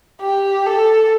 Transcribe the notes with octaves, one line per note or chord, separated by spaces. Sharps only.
G4
A4